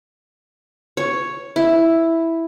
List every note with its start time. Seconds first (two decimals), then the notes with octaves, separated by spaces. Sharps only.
0.97 C#5
1.56 E4